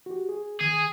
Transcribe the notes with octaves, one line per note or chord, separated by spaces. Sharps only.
F#4 G4
G#4
D#3 G#4